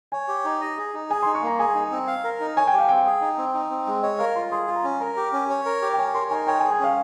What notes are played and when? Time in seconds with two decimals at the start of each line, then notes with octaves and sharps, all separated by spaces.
0.12 C#5 G#5
0.28 G4
0.45 D#4
0.61 D#5
0.78 G#4
0.94 D#4
1.10 G#4 G#5
1.22 D#4 C6
1.35 C#6
1.42 A#3 A#5
1.59 G#4 G#5
1.75 D#4
1.91 C4
2.07 F5
2.24 A#4
2.40 D#4
2.57 C#5 G#5
2.67 G5
2.73 G4 F5
2.89 C4 G5
3.06 G#4
3.21 D#4
3.38 C4
3.54 D#4
3.70 C4
3.87 G#3
4.03 C#5 D#5
4.19 A#4 F5
4.36 F4 C6
4.51 G#4 C6
4.68 F4
4.76 A#5
4.84 C#4
5.00 A#4 A#5
5.17 G4
5.33 C#4
5.50 C#5
5.66 A#4
5.82 G4
5.93 G5
5.98 C#5 G#5
6.14 A#4 C6
6.31 D#4 G#5
6.47 C#5 G5
6.60 G#4 G#5
6.71 G5
6.80 C#4 F5